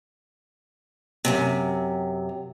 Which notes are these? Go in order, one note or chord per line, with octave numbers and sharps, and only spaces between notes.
F#2 A2 C3